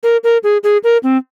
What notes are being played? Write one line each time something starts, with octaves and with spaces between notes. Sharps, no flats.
A#4
A#4
G#4
G#4
A#4
C4